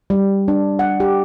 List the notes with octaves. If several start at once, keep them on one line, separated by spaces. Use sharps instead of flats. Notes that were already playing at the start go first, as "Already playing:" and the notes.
G3
D4
F#5
G4